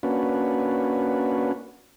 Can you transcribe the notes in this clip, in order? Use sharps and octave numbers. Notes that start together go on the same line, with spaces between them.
A#3 C#4 D4 F#4 B4